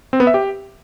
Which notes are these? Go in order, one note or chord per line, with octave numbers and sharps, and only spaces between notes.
C4
B3
E5
G4